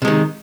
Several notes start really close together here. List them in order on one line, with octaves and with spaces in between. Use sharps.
C3 G#3 D#3